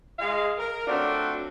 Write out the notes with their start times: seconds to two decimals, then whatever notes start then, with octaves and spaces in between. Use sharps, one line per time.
0.19 G#3 F5
0.58 A#4
0.87 F#3 A3 C4 D4 F4 F#4